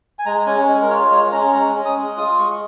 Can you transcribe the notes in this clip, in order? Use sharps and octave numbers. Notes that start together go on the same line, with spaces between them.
G#5
G#3 A#5
C#4 G#5
G#3
A#4
F4 C#5
G#3 C#5
C#4 A#5
G#3 A#5
C#4
D#6
G#3
F4 D#6
G#3 C#6